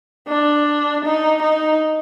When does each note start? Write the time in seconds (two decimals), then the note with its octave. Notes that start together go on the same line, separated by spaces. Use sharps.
0.28 D4
1.05 D#4
1.42 D#4